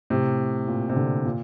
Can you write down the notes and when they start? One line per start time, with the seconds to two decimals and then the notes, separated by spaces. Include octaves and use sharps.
0.10 A2 C3
0.68 A#2
0.89 C3
0.96 A#2 D3
1.26 A#2